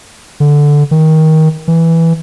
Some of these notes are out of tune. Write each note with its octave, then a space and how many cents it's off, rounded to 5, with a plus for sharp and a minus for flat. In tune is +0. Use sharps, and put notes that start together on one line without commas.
D3 -5
D#3 +20
E3 +0